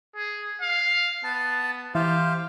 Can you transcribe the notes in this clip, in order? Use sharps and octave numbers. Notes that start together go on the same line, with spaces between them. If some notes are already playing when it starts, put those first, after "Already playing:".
G#4
F5
B3 A5
E3 G4 C5 F5